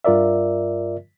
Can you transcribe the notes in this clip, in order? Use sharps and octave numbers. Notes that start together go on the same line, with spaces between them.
G2 F4 A#4 D5 E5